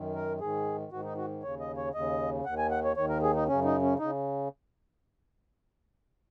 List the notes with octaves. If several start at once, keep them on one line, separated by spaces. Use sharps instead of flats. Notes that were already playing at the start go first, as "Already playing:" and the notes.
Already playing: F#2 D#3
A#4
G#2 D#3 G#4
G#2 D#3 F#4
D#4
F#4
D#2 C#3 C#5
D#5
C#5
D#2 C#3 D#5
D#2 D#3 F#5
G#5
F#5
C#5
D#2 D#3 C#5
A#4
G#4
D#4
F#2 C#3 C#4
D#4
C#4
C#3 D#4